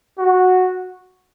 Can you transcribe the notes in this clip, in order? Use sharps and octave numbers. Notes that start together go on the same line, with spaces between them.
F#4